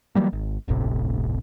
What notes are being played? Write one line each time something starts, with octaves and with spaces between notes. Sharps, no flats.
E3 F#3 G3 A#3
G#1
D1 G1 A2 C3